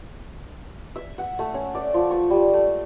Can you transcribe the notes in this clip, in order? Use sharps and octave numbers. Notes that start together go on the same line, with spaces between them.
E5
F#5
A3
C#4
D5
F3
C#6
G3
A3